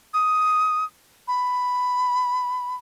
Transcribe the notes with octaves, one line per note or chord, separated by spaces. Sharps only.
D#6
B5